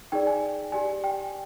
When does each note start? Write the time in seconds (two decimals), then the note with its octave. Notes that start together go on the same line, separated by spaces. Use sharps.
0.12 D#4 G#4 D5 G5
0.27 G#5
0.72 G4 D5 G#5
1.04 G5